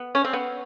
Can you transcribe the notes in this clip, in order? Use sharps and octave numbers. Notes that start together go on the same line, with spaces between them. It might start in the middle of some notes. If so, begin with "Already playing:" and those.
Already playing: B3
C#4
C4
B3